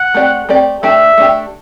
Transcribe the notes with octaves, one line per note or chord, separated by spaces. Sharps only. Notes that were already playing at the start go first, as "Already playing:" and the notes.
Already playing: F#5
A3 C4 G4 D5
A3 C4 G4 D5
A3 D4 G4 E5
A3 D4 G4